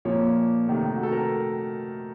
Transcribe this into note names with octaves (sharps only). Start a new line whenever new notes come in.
A#2 F3 A#3 C#5
C3 D#3 A3
F#4
A4
A#4